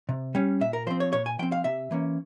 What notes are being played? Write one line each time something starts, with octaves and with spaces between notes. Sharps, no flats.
C3
G3 C#4
A#2 E5
A#4
F3 C4 C5
C#5
A#2 C#5
G#5
F3 C4 G5
F5
C3 E5
E3 A#3 C#4